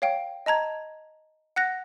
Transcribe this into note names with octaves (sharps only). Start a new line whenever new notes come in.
C#5 F5 G5 D7
D#5 A5 A#5 G#6
F#5 F#6 A#6